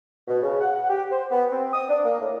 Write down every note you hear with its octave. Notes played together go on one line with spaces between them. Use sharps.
B2
C#3
F#5
F#5
G4
C5
B3
C4
D#6
D4
A#3
A2